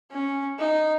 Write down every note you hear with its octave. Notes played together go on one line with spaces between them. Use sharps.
C#4
D#4